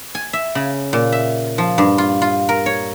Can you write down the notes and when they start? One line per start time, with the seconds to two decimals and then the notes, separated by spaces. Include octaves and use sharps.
0.15 G#5
0.33 E5
0.55 C#3
0.93 A#2
1.12 E5
1.58 F3
1.78 G2
1.98 F4
2.22 F4
2.49 A#4
2.66 C#5